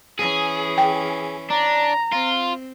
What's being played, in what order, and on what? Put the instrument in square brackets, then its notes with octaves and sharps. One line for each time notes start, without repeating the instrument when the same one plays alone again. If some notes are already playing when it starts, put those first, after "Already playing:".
[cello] E3 C#4 [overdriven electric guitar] G#4
[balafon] G5
[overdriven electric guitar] D4 [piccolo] A#5
[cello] C4 [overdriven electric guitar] F4